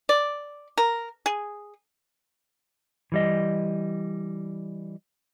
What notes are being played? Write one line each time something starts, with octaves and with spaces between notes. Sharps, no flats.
D5
A#4
G#4
E3 G3 D#5